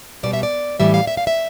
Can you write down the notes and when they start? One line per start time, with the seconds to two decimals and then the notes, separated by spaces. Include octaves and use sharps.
0.23 B2 G3 D5
0.33 E5
0.43 D5
0.80 A2 E3 G3 E5
0.94 F5
1.07 E5
1.17 F5
1.27 E5